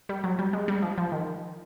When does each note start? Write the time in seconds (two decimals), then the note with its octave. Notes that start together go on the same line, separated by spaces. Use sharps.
0.09 G3
0.24 F#3
0.39 G3
0.53 G#3
0.68 G3
0.82 F3
0.98 F3
1.12 D#3